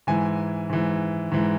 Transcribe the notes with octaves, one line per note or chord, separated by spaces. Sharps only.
G#2 E3 G#5
G#2 E3
G#2 E3